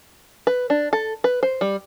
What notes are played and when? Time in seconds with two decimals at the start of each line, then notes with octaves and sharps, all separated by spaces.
0.47 B4
0.70 D4
0.93 A4
1.24 B4
1.43 C5
1.61 G3